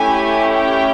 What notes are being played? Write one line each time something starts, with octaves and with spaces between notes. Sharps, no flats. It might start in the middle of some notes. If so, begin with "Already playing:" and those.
Already playing: A3 C#4 E4 G4 G#5
G5